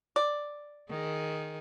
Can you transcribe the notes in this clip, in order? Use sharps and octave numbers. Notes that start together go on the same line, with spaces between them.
D5
D#3 G#4